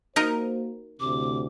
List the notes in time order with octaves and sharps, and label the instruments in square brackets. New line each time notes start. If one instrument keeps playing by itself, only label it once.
[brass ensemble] A#3 F#4 C5 [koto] D#4 A#4 D#5
[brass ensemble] D2 A2 C3 [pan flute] D6